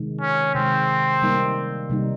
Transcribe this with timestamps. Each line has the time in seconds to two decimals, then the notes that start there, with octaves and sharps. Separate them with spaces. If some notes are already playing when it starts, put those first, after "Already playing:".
Already playing: C3 D#3 G#3
0.21 C#4
0.55 C3 D#3 G#3 C4
1.22 C3 G3 A#3 D#4
1.90 C3 G3 A#3 D#4